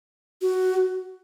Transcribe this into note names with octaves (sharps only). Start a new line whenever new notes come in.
F#4